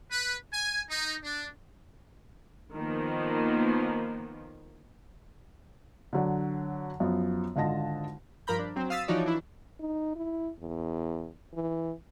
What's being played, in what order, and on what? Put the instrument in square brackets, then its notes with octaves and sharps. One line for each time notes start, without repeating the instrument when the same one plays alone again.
[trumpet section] B4
G#5
D#4
D4
[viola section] D#3 F3 A#3 B3
[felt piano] D3 F#3 D4
F#2 F3 B3
G#1 D3 F4 D#5 A5 A#6
[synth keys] G2 F3 A#4 A#5 B5 G6
D4
F#3 C4 C5
F5 D#6 E6 A6 B6
E3 F3 D#4 F#4 C#5 D5
E3 D4 E4
[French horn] D#4
E4
E2
E3